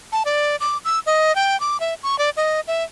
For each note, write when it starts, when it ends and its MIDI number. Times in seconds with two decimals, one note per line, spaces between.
0.12 0.23 81
0.25 0.56 74
0.60 0.78 86
0.85 1.00 88
1.06 1.35 75
1.36 1.59 79
1.60 1.80 86
1.80 1.94 76
2.03 2.18 85
2.19 2.30 74
2.37 2.60 75
2.67 2.84 76